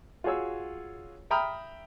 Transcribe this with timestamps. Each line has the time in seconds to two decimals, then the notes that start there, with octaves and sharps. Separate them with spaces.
0.24 F4 F#4 G#4 C#5 E6
1.30 E5 G5 A#5 B5 D#6 F6